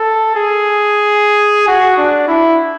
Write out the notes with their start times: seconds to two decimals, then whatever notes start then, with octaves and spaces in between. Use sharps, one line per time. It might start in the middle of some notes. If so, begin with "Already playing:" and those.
Already playing: A4
0.36 G#4
1.68 F#4
1.97 D4
2.28 E4